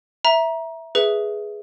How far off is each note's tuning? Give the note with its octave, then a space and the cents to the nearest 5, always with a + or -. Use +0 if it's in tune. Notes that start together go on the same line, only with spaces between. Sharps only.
E5 +0 A#5 +20
G#4 +5 B4 +0 E5 +0